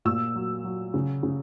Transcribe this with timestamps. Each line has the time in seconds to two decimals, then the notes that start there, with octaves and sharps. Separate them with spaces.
0.05 A#2 E6
0.36 F#3
0.64 F#3
0.94 C#3
1.23 C#3